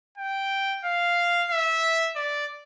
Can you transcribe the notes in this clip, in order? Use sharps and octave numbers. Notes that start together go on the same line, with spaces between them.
G5
F5
E5
D5